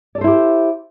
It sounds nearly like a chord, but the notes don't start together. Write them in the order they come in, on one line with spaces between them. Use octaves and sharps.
D5 A4 C5 E4 G4